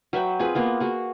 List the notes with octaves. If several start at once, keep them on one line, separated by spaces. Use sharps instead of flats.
F#3 B4 E5 G5
C4 F4 G#4 B4
A#3 B3 F4
A#3 F#4 G#4